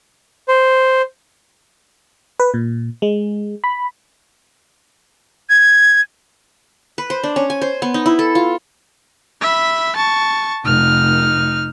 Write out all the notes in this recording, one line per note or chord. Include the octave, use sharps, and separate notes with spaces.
C5
B4
A#2
G#3
B5
G#6
B4
C5
D4
C#4
G#5
C5
B3
D#4
E4
A4
F4
E5 B5
A5 C#6
F1 D#4 F6